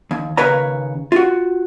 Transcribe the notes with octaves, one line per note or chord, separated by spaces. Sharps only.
D#2
D#2 C#3 A#4 B4 C#5 A#5
F4 F#4